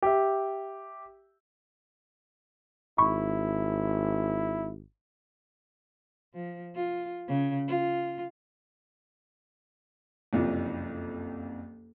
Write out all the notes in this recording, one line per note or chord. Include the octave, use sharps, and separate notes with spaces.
G4 E5
G#1 E4 B5 C#6
F3
F4
C#3
F4
F#1 C2 F2 F3